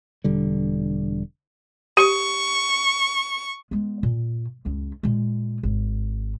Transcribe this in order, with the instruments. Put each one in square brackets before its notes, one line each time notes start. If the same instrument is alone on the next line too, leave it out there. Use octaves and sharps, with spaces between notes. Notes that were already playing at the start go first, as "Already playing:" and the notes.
[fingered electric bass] E1 D3 G3
[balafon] G4 [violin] C#6
[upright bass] G#3 B3
A#2
C#2 F#2
A#2 G#3
G#1